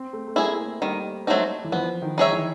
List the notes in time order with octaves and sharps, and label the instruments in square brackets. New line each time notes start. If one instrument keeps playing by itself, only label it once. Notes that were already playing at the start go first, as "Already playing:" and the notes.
Already playing: [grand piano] C4
A3
A3
[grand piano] A#3 [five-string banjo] E4 G#4
[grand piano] A3
[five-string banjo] D#3 [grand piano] G3
[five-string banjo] F#3 A3 C4 D#4
[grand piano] E3
[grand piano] F3 [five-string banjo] B3
[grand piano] D#3
[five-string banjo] D#4 G#4 C#5 E5
[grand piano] E3